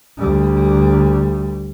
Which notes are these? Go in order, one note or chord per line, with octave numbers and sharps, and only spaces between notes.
D2 G3